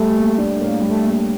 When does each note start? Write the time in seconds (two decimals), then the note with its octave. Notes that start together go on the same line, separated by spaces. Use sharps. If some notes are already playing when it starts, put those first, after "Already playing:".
Already playing: A2 G3 A3
0.17 A#3
0.38 D4
0.60 A2 A#3
0.82 G3
0.89 A3
1.04 A#3